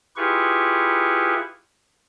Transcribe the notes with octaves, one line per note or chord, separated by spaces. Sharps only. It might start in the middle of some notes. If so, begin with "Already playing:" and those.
E4 F4 G4 G#4 B4 C#6